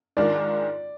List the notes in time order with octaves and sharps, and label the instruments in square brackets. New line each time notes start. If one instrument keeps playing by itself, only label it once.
[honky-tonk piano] G#2 D#3 G#3 D4 F4 [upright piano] D5